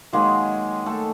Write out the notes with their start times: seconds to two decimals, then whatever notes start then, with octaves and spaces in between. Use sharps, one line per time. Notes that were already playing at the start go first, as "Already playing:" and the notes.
0.13 D#3 F#3 G#3 A#3 G#4
0.86 A3 A4